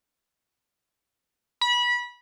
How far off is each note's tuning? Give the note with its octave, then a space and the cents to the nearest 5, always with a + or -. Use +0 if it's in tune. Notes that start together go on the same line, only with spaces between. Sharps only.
B5 -25